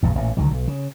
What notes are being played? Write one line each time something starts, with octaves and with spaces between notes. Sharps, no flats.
A#1 E2 G2
A1 A#2
C#2 D3 D#3 F#3
B1
C#3